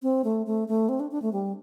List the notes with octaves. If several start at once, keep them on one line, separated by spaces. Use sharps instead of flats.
C4
A3
A3
A3
C4
D4
D4
A3
G3